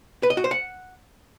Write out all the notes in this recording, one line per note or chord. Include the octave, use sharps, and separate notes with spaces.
B4
D#5
F#4
C5
F#5